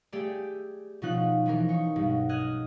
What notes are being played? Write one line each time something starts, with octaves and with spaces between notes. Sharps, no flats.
A3 G4 G#4 D5
B2 F3 C#4 D#4 F4 F#6
E3 F3 C#4 A#4
D#4 C#6
B1 G2 B2
D#5 F6 F#6 G#6